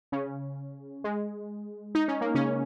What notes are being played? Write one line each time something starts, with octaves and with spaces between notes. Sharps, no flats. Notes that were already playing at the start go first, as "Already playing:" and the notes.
C#3 C#4
G#3
D#4
C#4
A#3
C#3 C#4